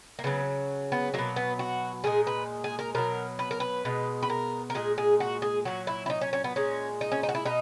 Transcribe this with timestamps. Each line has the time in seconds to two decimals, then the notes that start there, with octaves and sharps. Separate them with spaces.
0.19 A#3
0.24 C#3 F#3 B3
0.92 B3
1.14 B2 F#3 A#3
1.36 B3
1.59 F#4
2.04 A#2 G#3 G#4
2.27 B4
2.64 G#4
2.79 A#4
2.95 B2 F#3 A#4
3.39 B4
3.51 A#4
3.60 B4
3.85 B2 G#3
4.23 B4
4.30 A#4
4.70 A#4
4.75 A#2 G#3 G#4
4.98 G#4
5.20 F#4
5.42 G#4
5.65 A#2 F#3 F#4
5.87 E4
6.06 E4
6.10 D#4
6.21 C#4
6.33 C#4
6.44 B3
6.56 A#2 G#3 C#4
7.01 D#4
7.12 C#4
7.23 D#4
7.29 F#4
7.35 E4
7.45 B2 D#4